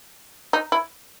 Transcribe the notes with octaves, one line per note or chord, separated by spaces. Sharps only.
D#4
E4